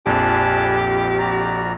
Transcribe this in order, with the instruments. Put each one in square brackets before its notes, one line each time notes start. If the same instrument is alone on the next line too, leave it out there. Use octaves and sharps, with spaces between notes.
[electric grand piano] A#1 F2 [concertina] D4 G#5 A5 [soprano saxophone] G4
[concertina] F#4 D5 A#5